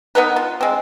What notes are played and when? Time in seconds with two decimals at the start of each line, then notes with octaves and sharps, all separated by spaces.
0.15 B3 D#4 A#4 B4
0.36 F4
0.61 G#3 C4